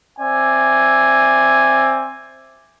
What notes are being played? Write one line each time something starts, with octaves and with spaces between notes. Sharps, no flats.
C4 D5 E5 G#5